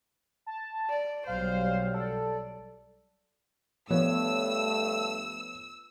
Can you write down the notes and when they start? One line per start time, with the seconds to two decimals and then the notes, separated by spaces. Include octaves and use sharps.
0.46 A5
0.90 D5
1.27 B1 F#3 G3 C5 F5
1.95 A4 D5
3.90 G2 F3 A3 B3 C#5 E6